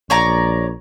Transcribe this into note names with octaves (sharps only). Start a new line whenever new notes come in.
A#1 C#5 D5 A#5